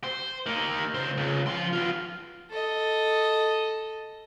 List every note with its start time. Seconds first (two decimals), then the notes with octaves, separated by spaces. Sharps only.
0.04 C5
0.46 A#3 D#4
0.94 C#2 C5
1.17 C#2
1.47 F3 C6
1.73 B3 F4
2.50 A4 D#5